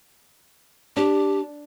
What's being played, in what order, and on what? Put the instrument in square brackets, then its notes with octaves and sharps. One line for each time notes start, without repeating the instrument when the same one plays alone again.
[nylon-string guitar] D4 [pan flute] G4